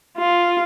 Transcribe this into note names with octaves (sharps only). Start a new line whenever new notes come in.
F4